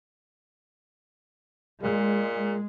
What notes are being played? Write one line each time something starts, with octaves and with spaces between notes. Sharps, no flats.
A#2 G#3